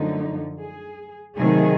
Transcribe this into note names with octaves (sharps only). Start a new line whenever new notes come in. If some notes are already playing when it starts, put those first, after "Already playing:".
Already playing: F#2 D3 F3 A3 D#4
G#4
C3 D#3 F#3 A3 G#4